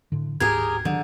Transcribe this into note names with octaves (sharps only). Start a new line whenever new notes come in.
A2 D3
D1 G#2 G4 G#4 A#4 G#6
D3 D#3 F#3